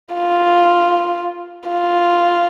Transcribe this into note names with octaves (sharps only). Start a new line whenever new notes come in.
F4
F4